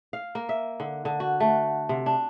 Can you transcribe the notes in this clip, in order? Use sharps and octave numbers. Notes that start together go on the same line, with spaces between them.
F5
A#3
E5
D3
D3
F#4
A3
C3
D4